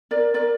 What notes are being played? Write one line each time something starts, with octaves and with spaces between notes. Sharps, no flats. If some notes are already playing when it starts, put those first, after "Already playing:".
A#4 D5
A#4 D5